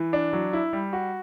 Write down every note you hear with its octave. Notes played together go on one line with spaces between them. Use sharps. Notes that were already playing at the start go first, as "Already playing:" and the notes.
Already playing: E3
D4
F#3
E4
G3
F#4